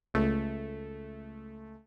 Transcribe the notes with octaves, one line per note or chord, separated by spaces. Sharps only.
C#2 A3